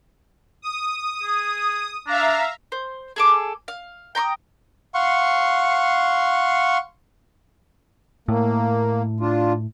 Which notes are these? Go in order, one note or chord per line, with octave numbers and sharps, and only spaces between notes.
D#6
G#4
D4 E5 F5 A#5
C5
G#4 A4 D6
F5
G5 A#5 C6 D#6
F5 F#5 C6 C#6
A2 A#3
D4 F4